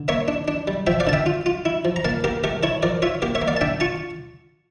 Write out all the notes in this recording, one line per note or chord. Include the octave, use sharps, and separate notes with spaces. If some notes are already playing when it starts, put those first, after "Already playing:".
Already playing: D3
A#3 C#5 E5
D4
D4
G3
F3 E5 G5
D5 F5
D3 A5
E5 G5
F4
F4
E4
F3
A#5
A#3 F5 A5
A#3 G4 A#4
A3 G4 A#4
E4 A4 C#5
F3 A#4 D5
F4 C#5 E5
A#3 G4 A#4
C#5 E5
A#3
D5 F5
A5
D4 E5 G5
F4 A5 C#6